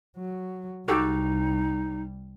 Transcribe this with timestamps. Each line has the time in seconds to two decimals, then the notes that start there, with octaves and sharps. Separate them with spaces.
0.17 F#3
0.88 C2 G3 D#4 F#4 G4 A4